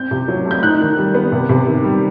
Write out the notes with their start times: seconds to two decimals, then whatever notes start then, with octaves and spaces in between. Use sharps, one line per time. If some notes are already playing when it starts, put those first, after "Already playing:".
Already playing: C4 G6
0.11 C3
0.28 F#3
0.45 A3
0.51 G6
0.63 D#4 F#6
0.81 D#3
0.98 G3
1.15 B3
1.32 C3
1.49 C3
1.67 D#3
1.84 G3